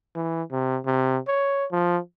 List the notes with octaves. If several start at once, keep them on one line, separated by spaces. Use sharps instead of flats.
E3
C3
C3
C#5
F3